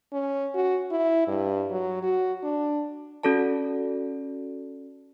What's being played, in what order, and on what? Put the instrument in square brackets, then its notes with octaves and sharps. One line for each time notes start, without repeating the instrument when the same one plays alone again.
[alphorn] C#4
F#4
E4
G2
F#3
F#4
D4
[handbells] C#4 F#4 A4 D5 A5